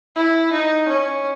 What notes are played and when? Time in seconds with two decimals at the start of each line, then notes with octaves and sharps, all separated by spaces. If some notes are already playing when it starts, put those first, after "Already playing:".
0.16 E4
0.52 D#4
0.88 C#4